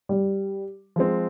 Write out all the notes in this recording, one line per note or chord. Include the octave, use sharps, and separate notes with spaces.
G3
F3 G#3 C4